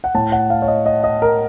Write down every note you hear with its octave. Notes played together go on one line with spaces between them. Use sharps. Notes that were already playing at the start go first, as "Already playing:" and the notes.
F#5
A2 A5
F#5
F5
C#5
D#5
D#5
D#5
A#4